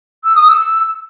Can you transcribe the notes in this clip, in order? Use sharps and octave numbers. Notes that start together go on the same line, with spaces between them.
E6
D#6
E6